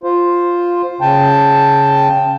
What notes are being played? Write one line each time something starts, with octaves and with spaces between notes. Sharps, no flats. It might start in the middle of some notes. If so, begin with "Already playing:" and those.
F4 C5
C#3 G5 A5